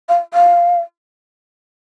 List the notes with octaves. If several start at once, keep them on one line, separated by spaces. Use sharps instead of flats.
F5
F5